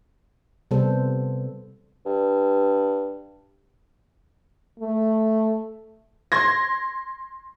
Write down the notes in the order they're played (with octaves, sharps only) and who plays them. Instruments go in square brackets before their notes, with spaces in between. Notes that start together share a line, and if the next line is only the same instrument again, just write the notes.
[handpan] C3 G3 B3 A4 C5
[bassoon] G2
[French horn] A3
[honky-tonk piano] C6 G#6 A#6